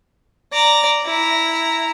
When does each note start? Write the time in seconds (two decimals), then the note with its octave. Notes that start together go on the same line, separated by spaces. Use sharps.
0.52 D5 A#5
1.06 E4 A#5